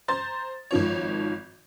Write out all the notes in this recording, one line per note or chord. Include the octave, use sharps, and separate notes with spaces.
C5 A#5 C6 A6
G#1 D#3 F3 C#5